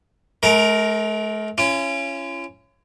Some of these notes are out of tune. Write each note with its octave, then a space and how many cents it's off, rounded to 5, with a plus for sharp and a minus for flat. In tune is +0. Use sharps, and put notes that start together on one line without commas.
A3 -45 A#4 +0 A#5 +20
C#4 +0 F4 -45